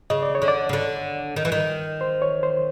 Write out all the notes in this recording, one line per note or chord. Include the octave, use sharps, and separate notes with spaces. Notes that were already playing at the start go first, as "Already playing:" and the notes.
C#3 D#5
D5
C#5
D3
D5
C#3
D3
D#3
E3
D#3
C5
C#5
C5